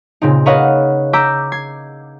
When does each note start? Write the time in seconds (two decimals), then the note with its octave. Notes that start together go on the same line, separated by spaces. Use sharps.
0.22 A#2 C#3 C4 D#4
0.46 A#4 B4 C#5 D#5 F5 F#5
1.13 A#5 D6 E6 G6 B6
1.52 G#6 C7